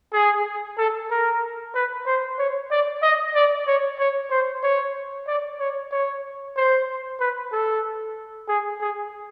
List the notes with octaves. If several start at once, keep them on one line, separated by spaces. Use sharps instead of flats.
G#4
A4
A#4
B4
C5
C#5
D5
D#5
D5
C#5
C#5
C5
C#5
D5
C#5
C#5
C5
B4
A4
G#4
G#4